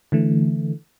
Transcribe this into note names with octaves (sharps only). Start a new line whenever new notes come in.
D3 E3 A3